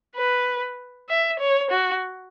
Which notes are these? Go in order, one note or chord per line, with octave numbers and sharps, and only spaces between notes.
B4
E5
C#5
F#4